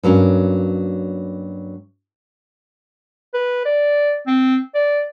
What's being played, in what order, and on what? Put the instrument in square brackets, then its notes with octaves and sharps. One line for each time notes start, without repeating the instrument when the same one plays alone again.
[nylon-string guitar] G2 F#3 A#3 C#4
[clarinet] B4
D5
C4
D5